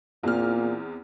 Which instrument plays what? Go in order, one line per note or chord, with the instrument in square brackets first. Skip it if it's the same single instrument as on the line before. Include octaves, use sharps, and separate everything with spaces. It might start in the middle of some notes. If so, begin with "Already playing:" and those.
[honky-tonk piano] E2 C4 F6 [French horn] A#2